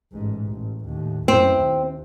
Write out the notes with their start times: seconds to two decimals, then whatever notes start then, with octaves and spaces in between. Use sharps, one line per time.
0.12 A1 G#2
0.48 A1
0.86 D#2 A2
1.28 F#2 C4 E4
1.58 D#2